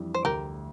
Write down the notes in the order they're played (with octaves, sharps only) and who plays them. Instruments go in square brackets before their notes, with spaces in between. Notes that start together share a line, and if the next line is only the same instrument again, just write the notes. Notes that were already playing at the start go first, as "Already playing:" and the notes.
Already playing: [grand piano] F2 E3 G3 D4
[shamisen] C5
[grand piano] D2 [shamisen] G4 A#4